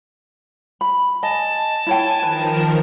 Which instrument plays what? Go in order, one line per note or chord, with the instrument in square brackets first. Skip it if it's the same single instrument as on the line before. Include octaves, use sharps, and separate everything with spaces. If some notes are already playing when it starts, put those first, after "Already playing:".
[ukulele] B5
[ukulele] D#5 G#5 [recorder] A5
[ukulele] E4 C#5 G5 [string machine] G#5
[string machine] D#3 F3 A#4 [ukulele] B4